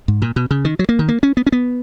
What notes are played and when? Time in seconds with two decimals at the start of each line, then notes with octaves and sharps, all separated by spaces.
0.08 G#2
0.22 A#2
0.36 B2
0.51 C#3
0.65 D#3
0.79 F#3
0.89 A#3
0.99 D#3
1.09 A#3
1.23 C#4
1.37 B3
1.47 C#4
1.52 B3